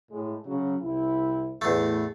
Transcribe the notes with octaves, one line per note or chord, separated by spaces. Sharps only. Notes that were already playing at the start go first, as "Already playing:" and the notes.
A2 G#3
C#3 F#3
C2 C4 E4
E2 A2 A3